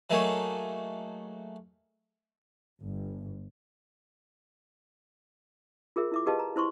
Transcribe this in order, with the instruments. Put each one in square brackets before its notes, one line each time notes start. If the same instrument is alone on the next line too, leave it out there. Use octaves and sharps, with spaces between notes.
[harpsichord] F#3 A3 A#3 D#4 G#4 C#5
[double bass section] G1
[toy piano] F4 G#4 A#4 E5
E4 E5 D6
G4 G#4 B4 D#5 F5 A5
A#5
E4 C5 C6 C#6